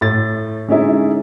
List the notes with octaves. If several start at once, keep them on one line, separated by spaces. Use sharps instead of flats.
A2 A6
D3 G#3 C#4 D#4 E4